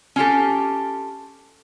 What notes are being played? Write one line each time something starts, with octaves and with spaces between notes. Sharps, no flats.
C#4 F4 G4 A4